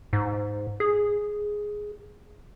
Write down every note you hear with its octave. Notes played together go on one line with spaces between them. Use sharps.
G#2
G#4